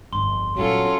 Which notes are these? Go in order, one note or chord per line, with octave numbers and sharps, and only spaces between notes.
G1 F2 C6
A#2 F#3 G3 C#4 F4 A4